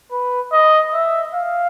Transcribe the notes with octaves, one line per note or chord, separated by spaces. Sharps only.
B4
D#5
E5
F5